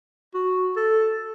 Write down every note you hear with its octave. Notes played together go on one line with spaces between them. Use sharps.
F#4
A4